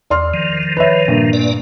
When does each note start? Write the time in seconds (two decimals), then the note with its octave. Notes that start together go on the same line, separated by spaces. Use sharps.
0.10 E2 D5 C6 F6
0.34 D#3 F3
0.77 B4 C#5 E5
1.08 G2 A#2
1.33 A#3 B4 D5